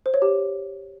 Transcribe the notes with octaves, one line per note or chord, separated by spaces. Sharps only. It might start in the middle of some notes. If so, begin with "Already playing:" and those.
C5
C#5
G4